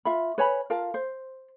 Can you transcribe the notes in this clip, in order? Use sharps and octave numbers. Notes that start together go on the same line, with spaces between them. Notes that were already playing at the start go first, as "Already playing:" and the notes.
F4 E5 B5
B4 C#5 G#5 B5
F4 A#4 F5 A5
C5